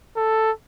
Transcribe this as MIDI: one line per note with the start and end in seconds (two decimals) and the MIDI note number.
0.17 0.51 69